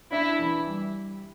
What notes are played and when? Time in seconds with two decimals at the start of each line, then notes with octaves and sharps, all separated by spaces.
0.12 D4 E4
0.39 E3
0.67 G3